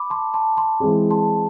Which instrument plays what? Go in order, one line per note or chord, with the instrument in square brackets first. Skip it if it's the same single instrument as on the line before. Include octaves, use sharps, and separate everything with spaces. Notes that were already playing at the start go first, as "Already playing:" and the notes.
Already playing: [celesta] B5 D6
A5 C6
A5 C6
A5 C6
[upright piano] E3 G#3 C4 G#4
[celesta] A5 C6